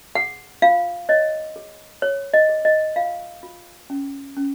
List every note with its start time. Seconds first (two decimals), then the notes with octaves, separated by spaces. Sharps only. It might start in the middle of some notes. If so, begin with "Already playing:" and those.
0.15 G#4 F#5
0.62 F4 F5
1.09 C#5 D#5
1.56 G#4
2.02 G#4 C#5
2.34 D#5
2.49 G#4
2.65 D#5
2.96 F4 F5
3.43 F4
3.90 C#4
4.37 C#4